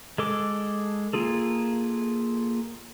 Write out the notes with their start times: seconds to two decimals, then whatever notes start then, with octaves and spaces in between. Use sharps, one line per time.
0.18 G#3 A4 D6
1.13 A#3 F4 G#4 A4